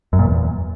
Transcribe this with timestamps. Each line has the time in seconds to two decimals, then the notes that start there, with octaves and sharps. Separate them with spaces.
0.13 F#2
0.19 A#2
0.25 E2